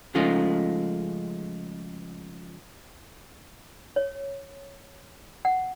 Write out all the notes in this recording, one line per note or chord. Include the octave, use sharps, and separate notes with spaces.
C#3 F3 G#3 A3 D#4 F4
C#5
F#5